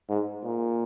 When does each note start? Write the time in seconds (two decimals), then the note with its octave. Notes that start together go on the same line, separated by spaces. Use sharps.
0.09 G#2
0.44 A#2